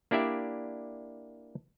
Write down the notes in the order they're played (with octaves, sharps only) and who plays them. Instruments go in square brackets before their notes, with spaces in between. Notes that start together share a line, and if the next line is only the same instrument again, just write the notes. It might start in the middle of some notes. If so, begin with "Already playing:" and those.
[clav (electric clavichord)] A#3 D4 E4 G4 D5 E5